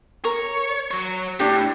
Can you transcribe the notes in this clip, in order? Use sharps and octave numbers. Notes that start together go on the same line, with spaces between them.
A#4 C#5
F#3 C#5
A2 D4 G4